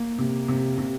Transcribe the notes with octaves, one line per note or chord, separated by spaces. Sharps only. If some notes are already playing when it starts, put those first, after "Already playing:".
Already playing: A#3
C3
C3
C3